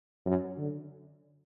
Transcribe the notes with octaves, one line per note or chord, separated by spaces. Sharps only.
F#2
D3